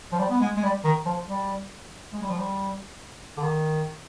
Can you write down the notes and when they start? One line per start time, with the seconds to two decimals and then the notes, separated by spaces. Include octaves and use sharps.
0.12 F3
0.19 G3
0.30 B3
0.41 G#3
0.57 G#3
0.63 G3
0.84 D#3
1.06 F3
1.27 G3
2.13 G#3
2.22 G3
2.30 F3
2.37 G3
3.37 D3
3.43 D#3